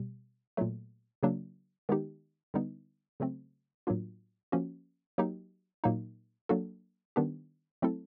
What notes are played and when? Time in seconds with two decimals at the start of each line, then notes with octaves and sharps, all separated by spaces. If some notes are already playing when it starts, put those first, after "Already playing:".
Already playing: B2 G3
0.57 A#2 F#3 A3
1.23 C#3 F#3 A#3 D4
1.89 D#3 G#3 B3 D#4 G4
2.54 D3 G3 B3 D#4
3.20 C#3 F#3 A3 C4
3.87 A2 F#3 A#3 D4 F4
4.52 F3 A#3 C#4 F#4
5.18 F#3 A#3 D#4 G4
5.84 A#2 F#3 A#3 D#4
6.49 F#3 A#3 D4 F#4 A4
7.16 D#3 G3 B3 D4 G4
7.82 F#3 A3 C4 E4 A4